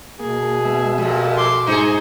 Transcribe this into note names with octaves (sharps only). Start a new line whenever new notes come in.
B2 A#3 G#4
G#3 B3 E5
F2 A#2 G4 A4 E5
C6 D6
G#2 D#4 G#4 C5 A#5